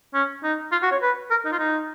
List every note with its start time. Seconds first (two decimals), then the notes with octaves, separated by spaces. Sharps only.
0.14 C#4
0.44 D#4
0.72 F4
0.83 F#4
0.92 C#5
1.02 B4
1.31 A#4
1.45 D#4
1.53 F4
1.59 D#4